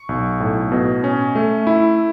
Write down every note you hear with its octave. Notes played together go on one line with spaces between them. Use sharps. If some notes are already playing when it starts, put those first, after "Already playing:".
Already playing: C#6
B1
A2
B2
C#4
A3
E4